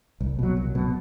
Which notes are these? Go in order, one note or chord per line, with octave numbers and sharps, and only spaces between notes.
C2
B2 F#3
C2
B2 F#3